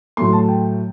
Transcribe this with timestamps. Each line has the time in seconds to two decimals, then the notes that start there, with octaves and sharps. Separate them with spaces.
0.17 A2 F#3 A3 C6
0.33 A5
0.48 G5